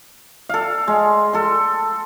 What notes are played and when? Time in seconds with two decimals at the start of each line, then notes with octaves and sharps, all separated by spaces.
0.49 A4 F5
0.88 G#3
1.33 A4 C6